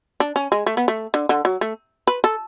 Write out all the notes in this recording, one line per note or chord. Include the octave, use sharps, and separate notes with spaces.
D4
C#4
G#3
A3
B3
A3
D3
D3
F#3
A3
B4
A4